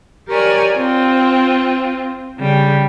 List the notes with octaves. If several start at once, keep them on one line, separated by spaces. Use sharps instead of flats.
G4 A#4 C#5 D5 G#5
C4 F4
C#3 G3